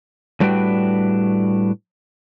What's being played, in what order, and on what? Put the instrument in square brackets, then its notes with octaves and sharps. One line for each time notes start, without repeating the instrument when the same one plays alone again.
[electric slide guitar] A2 G3 D4 F#4 B4 G5